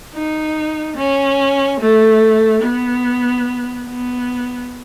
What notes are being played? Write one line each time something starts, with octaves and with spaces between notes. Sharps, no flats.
D#4
C#4
A3
B3
B3